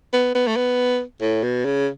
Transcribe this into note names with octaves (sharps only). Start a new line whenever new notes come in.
B3
B3
A3
B3
A2
B2
C#3